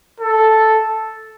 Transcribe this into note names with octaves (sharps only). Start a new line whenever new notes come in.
A4